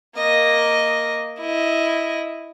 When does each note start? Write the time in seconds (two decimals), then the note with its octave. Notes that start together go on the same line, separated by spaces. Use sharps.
0.17 A#3 D#5
1.40 E4 D#5